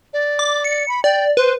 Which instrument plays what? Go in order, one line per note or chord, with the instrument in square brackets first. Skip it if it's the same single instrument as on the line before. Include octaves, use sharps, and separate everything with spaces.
[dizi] D5
[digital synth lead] D6
C#7
[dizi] B5
[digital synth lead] D5 [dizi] G5
[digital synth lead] B4 [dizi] C5